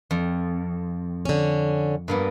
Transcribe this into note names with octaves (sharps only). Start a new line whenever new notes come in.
F2
D3 C#4
G2 A#3 B3